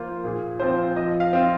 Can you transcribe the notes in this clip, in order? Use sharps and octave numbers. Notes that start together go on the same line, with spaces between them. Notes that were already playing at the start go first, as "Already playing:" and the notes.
Already playing: F3 A#3 F4 C5
A#2 G#4
F3 C4 F4 C5
F3 D#5
F5
C4 F4